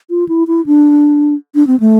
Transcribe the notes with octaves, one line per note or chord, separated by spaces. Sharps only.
F4
E4
E4
D4
D4
C4
A3